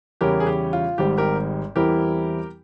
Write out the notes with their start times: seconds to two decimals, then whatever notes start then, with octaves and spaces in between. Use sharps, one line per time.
0.21 E2 C#3 G3 C#4 E4 G4 A#4
0.40 G#4
0.47 G4
0.73 F4
0.98 G#1 G#2 G3 C4 G4
1.18 G4 A#4
1.76 E2 E3 G3 C4 E4 G4 A#4